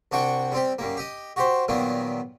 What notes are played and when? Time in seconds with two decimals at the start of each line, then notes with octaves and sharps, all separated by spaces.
0.12 C2 D4 F#4 F#5 G5 C#6
0.52 G3 C4 G4
0.79 F#2 G3 A#3
0.97 G4 D#5
1.36 F#4 G4 C5
1.68 A#2 D#3 F#3 G3 A#3 B3